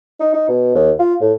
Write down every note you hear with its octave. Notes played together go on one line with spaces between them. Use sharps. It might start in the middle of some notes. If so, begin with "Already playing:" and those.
D#4
D#4
B2
D#2
F4
A2